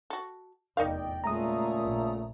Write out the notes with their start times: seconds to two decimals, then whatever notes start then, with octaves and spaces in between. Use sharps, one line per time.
0.10 F#4 A4
0.77 F1 E2 D#4 A#4 D5 D#5 F5 G5
1.24 A#2 C#3 G#3 A3 A#5 D#6
1.81 A#1